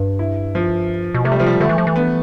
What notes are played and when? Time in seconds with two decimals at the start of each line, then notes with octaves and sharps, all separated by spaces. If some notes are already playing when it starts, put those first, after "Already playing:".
Already playing: G2
0.19 E4
0.55 F3
1.14 B2
1.24 C3 A3
1.32 G3
1.40 F3
1.46 G3
1.60 D3 A3
1.69 E3
1.78 F3
1.87 E3
1.96 B3